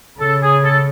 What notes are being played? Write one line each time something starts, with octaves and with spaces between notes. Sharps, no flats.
C#3 A4
G#4
A4